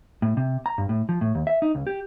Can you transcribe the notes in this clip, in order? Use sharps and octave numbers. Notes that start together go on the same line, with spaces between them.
A2
C3
A#5
G2
A2
F3
A2
D#2
E5
D#4
C#2
G4